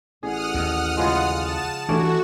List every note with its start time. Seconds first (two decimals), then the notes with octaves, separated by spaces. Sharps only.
0.23 A1 G#4 F#5 D#6 F6
0.54 D#2
0.97 C#3 F3 G#3
1.37 A5 E7
1.89 G2 E3 A3 C#4 D4 F#4